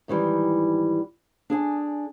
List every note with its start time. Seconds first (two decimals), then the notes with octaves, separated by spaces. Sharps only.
0.08 G#2 D#3 E3 G3
1.50 D4 G#4 G#5